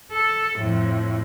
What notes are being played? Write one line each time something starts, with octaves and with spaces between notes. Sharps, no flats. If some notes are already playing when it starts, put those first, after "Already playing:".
A4
F2 A2